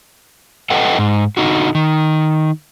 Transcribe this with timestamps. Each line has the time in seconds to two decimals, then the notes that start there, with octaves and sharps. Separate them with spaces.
0.70 A4 B4 D#5 F#5 G5
0.99 G#2
1.37 D3 D#4 F#4
1.75 D#3